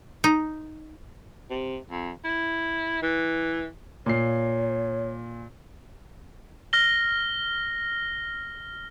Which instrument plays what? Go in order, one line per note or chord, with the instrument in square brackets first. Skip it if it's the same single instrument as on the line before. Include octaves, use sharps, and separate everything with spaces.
[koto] D#4
[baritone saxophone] C3
F2
E4
E3
[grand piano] A#2 C7 [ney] C#5
[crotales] F6 A#6 G7